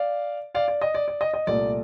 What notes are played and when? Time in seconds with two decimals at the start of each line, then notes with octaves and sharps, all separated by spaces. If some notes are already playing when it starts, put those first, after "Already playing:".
Already playing: D5 F5
0.55 D5 F5
0.68 D5
0.81 D#5
0.95 D5
1.08 D5
1.21 D#5
1.34 D#5
1.47 C2 A#2 A3 D5